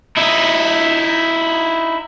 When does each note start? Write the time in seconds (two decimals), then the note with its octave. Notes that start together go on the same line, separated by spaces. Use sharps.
0.17 D#4 E4